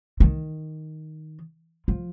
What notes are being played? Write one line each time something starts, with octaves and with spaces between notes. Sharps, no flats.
D#3
F3